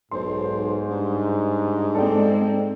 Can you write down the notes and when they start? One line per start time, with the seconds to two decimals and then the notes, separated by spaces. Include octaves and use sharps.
0.11 B1 G#2 C5 C6
0.90 G2
1.95 G#3 C4 A4 D5 G5